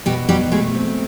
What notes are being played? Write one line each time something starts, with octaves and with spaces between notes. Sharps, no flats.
B2 G3 G4
F#3 G3 G4
G#3 A3 G#4
C4